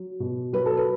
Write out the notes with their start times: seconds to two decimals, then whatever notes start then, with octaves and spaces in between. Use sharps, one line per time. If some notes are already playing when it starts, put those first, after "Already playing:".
Already playing: F#3
0.20 B2
0.53 F#3 B4
0.66 A4
0.77 B4